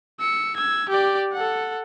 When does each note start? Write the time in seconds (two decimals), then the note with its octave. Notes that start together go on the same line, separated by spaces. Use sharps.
0.20 E6 C#7
0.56 E6 G#6
0.89 G4 D5
1.33 A4 F#5